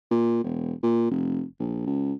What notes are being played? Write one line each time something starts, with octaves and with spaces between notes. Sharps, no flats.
A#2
E1
A#2
F1
A#1
C#2